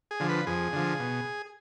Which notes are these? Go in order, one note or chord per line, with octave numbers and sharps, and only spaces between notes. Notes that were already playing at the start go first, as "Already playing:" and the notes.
G#4
D3 F3
B4
F2 G#4
D3 F3
B2